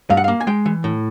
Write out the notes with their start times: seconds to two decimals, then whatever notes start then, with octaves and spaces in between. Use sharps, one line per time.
0.10 G2 F5
0.17 F#5
0.24 A#3 F5
0.41 G#5
0.47 G#3 G5
0.66 E3
0.84 A2